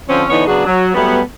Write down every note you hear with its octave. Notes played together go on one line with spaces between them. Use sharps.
D3 F3 C4 C#4
D3 E3 B3 D4 D#4 C#5
C#3 F#3 B3 D4 F#4 G#4
F#3
F#3 G3 A3 B3